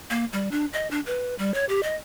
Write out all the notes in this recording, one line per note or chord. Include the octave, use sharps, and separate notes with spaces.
A#3
G3
D4
D#5
D4
B4
G3
C#5
G4
D#5